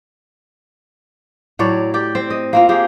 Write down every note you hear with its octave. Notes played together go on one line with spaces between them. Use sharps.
A2 F#3 C#5 D5
G4 D5
C4
D#5
A#3 C4 F4
A#3 G4 G#4